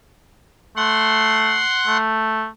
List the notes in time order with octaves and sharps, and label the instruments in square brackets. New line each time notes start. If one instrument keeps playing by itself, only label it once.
[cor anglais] A3 [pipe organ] F#5 C6
[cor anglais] A3